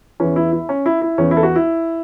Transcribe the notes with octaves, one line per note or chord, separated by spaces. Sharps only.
E2 E3 C#4
E4
E4
C#4
E4
E4
E2 E3 C#4
E4
A4
F#4
E4